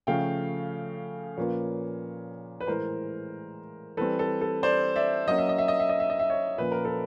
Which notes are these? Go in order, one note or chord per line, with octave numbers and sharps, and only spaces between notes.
C#3 F3 A3 F5 G5
A#2 F3 A#3 C#4 F4 B4 C#5
B4
A2 E3 G#3 A#4 C5
E3 G3 C4 A4 B4
A4
A4
C5 D5
D5 E5
F#3 A#3 C#4 D#5
E5
D#5
E5
D#5
E5
D#5
E5
D#5
E5
C#5 D#5
A#2 F3 A#3 C#4 B4
A#4
A4 B4